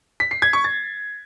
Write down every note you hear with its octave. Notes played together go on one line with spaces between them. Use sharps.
B6
C7
G#6
C#6
A6